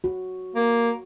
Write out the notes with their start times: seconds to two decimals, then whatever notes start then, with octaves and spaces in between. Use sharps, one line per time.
0.04 F#4
0.55 A#3